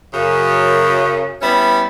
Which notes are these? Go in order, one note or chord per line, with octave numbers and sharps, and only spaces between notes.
F#2 C#3
G3 B3 C#4 E4